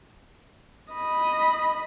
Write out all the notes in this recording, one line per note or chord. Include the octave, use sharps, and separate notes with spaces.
D#5 B5